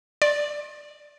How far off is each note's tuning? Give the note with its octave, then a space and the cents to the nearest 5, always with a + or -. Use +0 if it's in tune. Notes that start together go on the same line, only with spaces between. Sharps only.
D5 +0 C6 +35